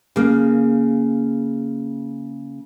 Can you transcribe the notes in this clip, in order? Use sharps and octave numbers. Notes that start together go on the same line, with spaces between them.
C#3 A#3